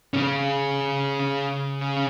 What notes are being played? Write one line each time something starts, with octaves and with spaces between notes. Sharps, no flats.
C#3 C#4